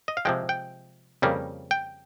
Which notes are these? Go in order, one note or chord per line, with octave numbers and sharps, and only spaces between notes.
D#5
F5
C3 F3 G#3 G5
G5
F2 C#3 G3 A#3
G5